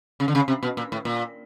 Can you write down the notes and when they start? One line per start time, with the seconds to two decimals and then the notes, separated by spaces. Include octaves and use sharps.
0.20 C#3
0.28 D3
0.35 C#3
0.48 C3
0.63 B2
0.77 A#2
0.92 A2
1.05 A#2